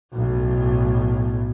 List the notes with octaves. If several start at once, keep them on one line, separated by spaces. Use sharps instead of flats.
B1 A2